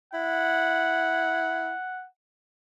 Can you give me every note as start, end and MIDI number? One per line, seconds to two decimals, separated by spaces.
0.14 1.72 64
0.14 2.06 78